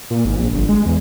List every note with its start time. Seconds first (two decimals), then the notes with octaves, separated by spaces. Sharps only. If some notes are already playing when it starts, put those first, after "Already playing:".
0.10 A#2
0.25 G#1
0.38 A#1
0.53 G1
0.69 G#3
0.86 E2